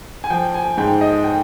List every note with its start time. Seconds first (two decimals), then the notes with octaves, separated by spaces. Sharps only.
0.24 G#5
0.30 F3 G5
0.54 G#5
0.77 G#2 G5
1.01 D#5
1.24 G5